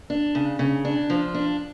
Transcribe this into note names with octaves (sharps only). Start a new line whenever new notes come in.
D4
C#3
C#3
D4
F3
D4